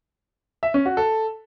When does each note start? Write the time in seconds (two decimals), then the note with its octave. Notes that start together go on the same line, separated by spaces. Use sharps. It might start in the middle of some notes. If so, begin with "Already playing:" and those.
0.63 E5
0.74 C#4
0.86 F#4
0.97 A4